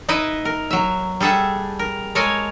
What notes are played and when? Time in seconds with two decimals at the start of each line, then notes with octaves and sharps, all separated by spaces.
0.09 D#4 E4 B4 D#5 E5
0.45 A#4
0.71 F#3 E5
1.20 G3 G#4 A4 E5 F#5
1.79 A#4
2.15 G#3 A4 A#4 C#5 G#5